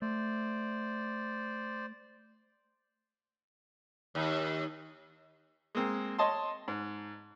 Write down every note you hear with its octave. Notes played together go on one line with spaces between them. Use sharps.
A3 C5 D5
D#2
G#3 A#3 C4
C#5 D#5 A5 C6
G#2